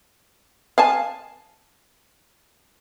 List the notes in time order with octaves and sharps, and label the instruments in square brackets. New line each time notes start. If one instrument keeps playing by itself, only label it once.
[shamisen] F5 G#5 A5